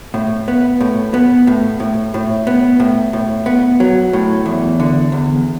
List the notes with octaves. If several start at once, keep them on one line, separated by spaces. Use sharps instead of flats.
A2
B3
A2
B3
A2
A2
A2
B3
A2
A2
B3
F#3
A2
E2
D3
E2